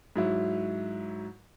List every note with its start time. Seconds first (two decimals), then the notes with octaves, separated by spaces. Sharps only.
0.16 G#2 F#3 E4